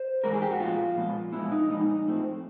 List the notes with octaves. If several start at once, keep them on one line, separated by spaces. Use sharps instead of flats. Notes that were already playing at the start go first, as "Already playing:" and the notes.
Already playing: C5
G#2 E3 G#3 A#4
G#4
G4
F#4
A#2 F3 G#3 B3 F4
A#2 F3 G#3 B3
A#2 F3 G#3 B3 E4
D#4
A#2 F3 G#3 B3 D#4
A2 F3 A3 C4